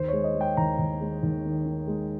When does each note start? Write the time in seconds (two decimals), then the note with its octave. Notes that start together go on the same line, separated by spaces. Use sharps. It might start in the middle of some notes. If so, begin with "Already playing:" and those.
Already playing: D#2 C5
0.08 G#3 C#5
0.24 D#5
0.35 G#3
0.41 G5
0.57 D#2 A#5
0.79 D#2
1.01 G#3
1.23 D#2
1.45 D#3
1.66 D#3
1.87 G#3